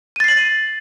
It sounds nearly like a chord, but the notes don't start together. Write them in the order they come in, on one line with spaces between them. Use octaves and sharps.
D#7 A6 C7 F#7